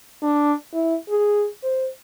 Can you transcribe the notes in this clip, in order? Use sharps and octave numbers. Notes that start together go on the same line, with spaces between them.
D4
E4
G#4
C5